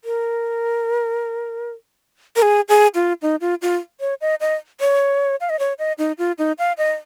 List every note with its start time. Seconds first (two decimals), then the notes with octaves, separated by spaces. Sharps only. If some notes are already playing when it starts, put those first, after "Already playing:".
0.04 A#4
2.36 A#4
2.42 G#4
2.69 G#4
2.95 F4
3.22 D#4
3.41 F4
3.62 F4
4.00 C#5
4.21 D#5
4.41 D#5
4.80 C#5
5.41 F5
5.50 D#5
5.59 C#5
5.79 D#5
5.98 D#4
6.18 F4
6.38 D#4
6.59 F5
6.78 D#5